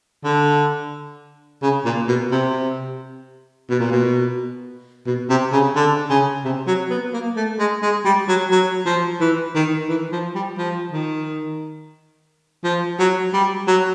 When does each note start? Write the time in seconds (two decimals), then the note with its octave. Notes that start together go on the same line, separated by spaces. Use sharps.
0.24 D3
1.62 C#3
1.85 A#2
2.08 B2
2.31 C3
3.69 B2
3.80 A#2
3.92 B2
5.06 B2
5.30 C3
5.52 C#3
5.76 D3
6.10 C#3
6.44 C3
6.67 F#3
6.90 B3
7.13 A#3
7.37 A3
7.59 G#3
7.82 G#3
8.05 G3
8.28 F#3
8.51 F#3
8.86 F3
9.20 E3
9.55 D#3
9.89 E3
10.12 F3
10.35 G3
10.58 F3
10.92 D#3
12.64 F3
12.99 F#3
13.33 G3
13.67 F#3